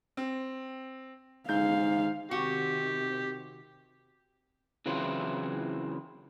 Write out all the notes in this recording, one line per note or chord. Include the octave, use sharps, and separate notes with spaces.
C4
G#2 F5 G6
C3 D#3 C4 F#4 G4
C#3 E3 F#3 C4 E4 F4